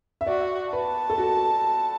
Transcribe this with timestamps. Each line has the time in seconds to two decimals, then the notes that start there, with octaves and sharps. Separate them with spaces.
0.21 E5
0.27 F#4 D5
0.72 B4 A5
1.10 A4
1.18 F#4